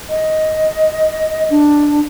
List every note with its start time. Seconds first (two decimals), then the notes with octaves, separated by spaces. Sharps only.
0.09 D#5
1.50 D4